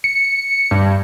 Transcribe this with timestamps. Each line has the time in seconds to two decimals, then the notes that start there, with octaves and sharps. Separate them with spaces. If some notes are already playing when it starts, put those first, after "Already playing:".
0.04 C#7
0.71 G2